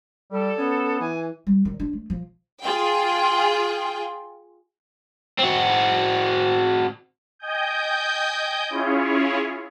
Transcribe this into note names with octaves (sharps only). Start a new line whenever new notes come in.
G3 A4
B3 C#4
E3 G#5
G3
D#3
D4
A3
F3
F4 G#4 G5
C4 F#4
D#5 G5 G#5 D#6 G6
C#4 E4 F4 G#4 C#5